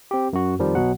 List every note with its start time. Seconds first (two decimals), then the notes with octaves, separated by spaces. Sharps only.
0.11 C4 G4
0.33 F#2 F#4
0.59 F2 D#3 F3 G3
0.75 B1 B2 F#3 F#5